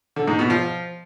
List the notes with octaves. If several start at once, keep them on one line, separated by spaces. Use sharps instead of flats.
D3
G#2
B2
F3